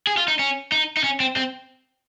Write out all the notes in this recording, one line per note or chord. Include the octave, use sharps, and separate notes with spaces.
G#4
F4
D#4
C#4
D#4
D#4
C#4
C4
C4